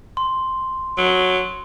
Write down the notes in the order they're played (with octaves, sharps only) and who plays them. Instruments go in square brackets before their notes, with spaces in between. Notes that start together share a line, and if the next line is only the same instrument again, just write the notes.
[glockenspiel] C6
[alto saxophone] F#3